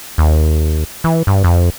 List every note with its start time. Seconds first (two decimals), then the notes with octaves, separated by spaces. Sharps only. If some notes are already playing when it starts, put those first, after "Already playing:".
0.18 D#2
1.04 E3
1.27 G2
1.44 F2